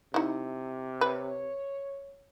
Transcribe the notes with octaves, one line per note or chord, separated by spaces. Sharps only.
C3 D#4 E4
B4 C#5